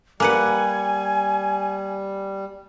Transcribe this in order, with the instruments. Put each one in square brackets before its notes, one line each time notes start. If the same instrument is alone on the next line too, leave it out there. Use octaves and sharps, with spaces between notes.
[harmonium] G3 [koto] A#3 B4 F#5 [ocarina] G#5